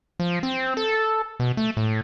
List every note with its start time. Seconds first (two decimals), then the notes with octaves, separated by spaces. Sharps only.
0.20 F3
0.43 C4
0.77 A4
1.40 B2
1.57 A3
1.77 A2